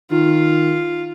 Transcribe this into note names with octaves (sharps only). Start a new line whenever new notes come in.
D#3 F4